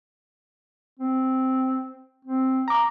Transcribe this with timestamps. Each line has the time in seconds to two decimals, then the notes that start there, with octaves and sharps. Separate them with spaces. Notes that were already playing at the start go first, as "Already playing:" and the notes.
0.99 C4
2.25 C4
2.68 A#5 D6